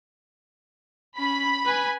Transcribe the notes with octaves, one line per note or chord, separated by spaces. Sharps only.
C#4 B5
B4 G#5